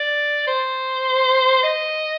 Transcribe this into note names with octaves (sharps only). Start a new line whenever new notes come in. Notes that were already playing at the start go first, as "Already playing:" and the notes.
Already playing: D5
C5
D#5